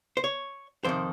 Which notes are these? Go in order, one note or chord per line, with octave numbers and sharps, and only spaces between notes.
C5
C#5
F2 C3 D#3 C5